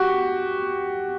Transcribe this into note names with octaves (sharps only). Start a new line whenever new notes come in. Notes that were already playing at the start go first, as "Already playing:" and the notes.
Already playing: F#4 G4